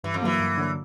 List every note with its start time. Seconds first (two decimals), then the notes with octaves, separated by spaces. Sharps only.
0.04 G2 E3
0.14 F2
0.22 D3 E3 F#3 A#3
0.40 G2
0.57 D3 F#3 A#3